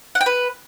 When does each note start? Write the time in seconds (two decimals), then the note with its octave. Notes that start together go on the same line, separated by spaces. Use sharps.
0.15 F#5
0.21 G5
0.26 B4